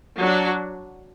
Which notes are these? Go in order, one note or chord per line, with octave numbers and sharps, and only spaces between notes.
F#3 D4 F#4